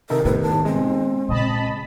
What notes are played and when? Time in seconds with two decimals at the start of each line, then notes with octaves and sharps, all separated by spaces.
0.10 C3 D#3 D#4 A4 A#4 E5
0.25 A2 B3 B4
0.43 A5
0.65 G#3 C4
1.29 A#2 C#3 D#5 A5 B5